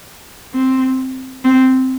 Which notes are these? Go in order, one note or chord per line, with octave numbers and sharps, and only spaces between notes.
C4
C4